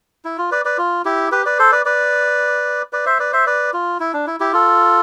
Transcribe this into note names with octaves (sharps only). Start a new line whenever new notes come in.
E4
F4
B4 D5
B4 D5
F4
E4 G4
G4 B4
B4 D5
A4 C5
B4 D5
B4 D5
B4 D5
C5 E5
B4 D5
C5 E5
B4 D5
F4
E4
D4
E4
E4 G4
F4 A4